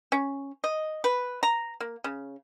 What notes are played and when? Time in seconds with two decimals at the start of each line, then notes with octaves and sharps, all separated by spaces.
0.12 C#4
0.64 D#5
1.04 B4
1.43 A#5
1.80 A#3
2.04 C#3